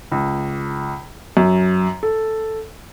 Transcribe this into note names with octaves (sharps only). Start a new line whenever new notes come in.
C#2
F#2
A4